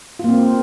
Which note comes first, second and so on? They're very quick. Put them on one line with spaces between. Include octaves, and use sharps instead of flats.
F4 A#3 C4